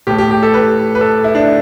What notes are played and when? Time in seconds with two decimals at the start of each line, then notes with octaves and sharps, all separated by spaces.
0.07 A2 A3 G4
0.18 G4
0.31 G4
0.43 A4
0.54 B4
0.95 B4
1.01 A4
1.24 E4
1.35 D4